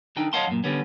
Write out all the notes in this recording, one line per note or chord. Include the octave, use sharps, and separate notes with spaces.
D3 D4 D#4 G5
C#5 D#5 F5 F#5 A5 C6
F#2 A#2
D3 G3 B3 C#4